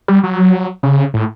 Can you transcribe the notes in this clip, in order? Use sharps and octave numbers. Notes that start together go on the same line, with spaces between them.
G3
F#3
C#3
A2